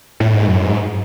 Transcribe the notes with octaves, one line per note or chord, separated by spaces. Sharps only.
A2
G#2
F#2
G#2